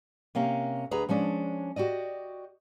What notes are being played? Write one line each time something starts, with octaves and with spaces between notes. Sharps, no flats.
C3 A#3 C#4
D2 G#4 B4 A#5
F3 G#3 C#4 D4
F#4 G4 D5 D#5